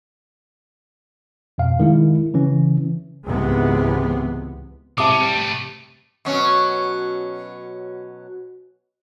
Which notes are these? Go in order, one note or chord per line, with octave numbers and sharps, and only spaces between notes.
F2 B2 F5
D#3 G#3 E4
C#3 E3 C#4
C#2 G#2 C3 E3 G#3 B3
C3 G#3 G4 E5 A5 D6
C3 C#4
G3
A3 B4
B2 F#3 C#4